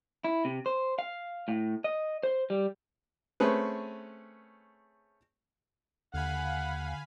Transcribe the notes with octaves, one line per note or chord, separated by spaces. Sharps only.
E4
C3
C5
F5
A2
D#5
C5
G3
A3 C4 C#4 G#4 B4
D#2 D3 F5 F#5 G#5 B5